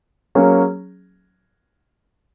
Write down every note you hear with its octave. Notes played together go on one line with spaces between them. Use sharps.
F#3 A#3 C#4 G#4